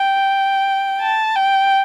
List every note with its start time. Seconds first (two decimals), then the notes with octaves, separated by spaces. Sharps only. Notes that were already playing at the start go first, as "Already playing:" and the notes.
Already playing: G5
1.01 A5
1.36 G5